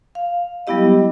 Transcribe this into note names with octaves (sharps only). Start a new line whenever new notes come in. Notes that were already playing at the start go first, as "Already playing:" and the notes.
F5
F#3 G3 B3 E4 G4 D#5